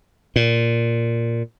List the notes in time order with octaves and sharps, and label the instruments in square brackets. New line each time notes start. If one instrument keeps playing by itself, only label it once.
[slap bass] A#2